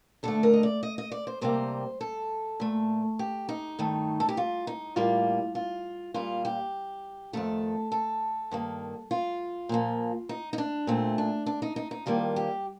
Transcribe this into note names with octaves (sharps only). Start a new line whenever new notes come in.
D2 D3 A3 A4
A#4
D#5
D5
D#5
D#5
D5
C5
D2 C3 G3 A#3 C5
A4
A#2 A3
G4
D#4
G2 D#3 A3
A4
G4
F4
D#4
A2 G3 A#3 F4
F4
A#2 G3 A#3 F4
G4
F2 D#3 A3 A4
A4
G2 D#3 A#3
F4
A#2 F3 A#3
D#4
D#4
D4
A#2 A3 C4
D4
D4
D#4
D#4
D#4
F2 D#3 G3 A#3 F4
G4